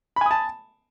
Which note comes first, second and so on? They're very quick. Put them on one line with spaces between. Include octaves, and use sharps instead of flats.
B5 G#5 D#6 A5